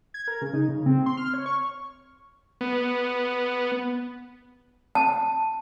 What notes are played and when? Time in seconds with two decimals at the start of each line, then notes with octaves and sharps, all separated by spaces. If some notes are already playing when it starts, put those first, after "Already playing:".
0.14 G#6
0.28 A#4
0.42 C#3
0.54 D#4
0.69 C#3
0.86 C4
1.06 C6
1.17 F6
1.34 C#5
1.46 C#6
2.61 B3
4.95 A5